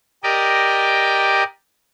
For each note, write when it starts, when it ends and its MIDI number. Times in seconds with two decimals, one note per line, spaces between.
0.23 1.44 67
0.23 1.44 70
0.23 1.44 74
0.23 1.44 75
0.23 1.44 79